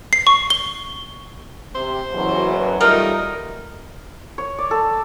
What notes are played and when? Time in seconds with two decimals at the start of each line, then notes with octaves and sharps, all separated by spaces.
0.13 C7
0.27 C#6
0.50 G7
1.75 C3 C5
2.13 F#1 E2 B2 E3 F#3
2.81 G3 A3 D#4 F4 A#4
4.38 C#5
4.58 D5
4.71 A4